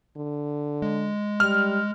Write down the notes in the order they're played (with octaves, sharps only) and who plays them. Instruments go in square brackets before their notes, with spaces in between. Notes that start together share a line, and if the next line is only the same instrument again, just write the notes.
[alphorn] D3
[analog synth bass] G#3
[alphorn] G3 [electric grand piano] F6